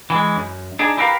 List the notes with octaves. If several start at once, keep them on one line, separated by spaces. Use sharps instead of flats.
E3 G#3
F#2
D4 D#4 G#4
E4 G4 A#4 B4 F5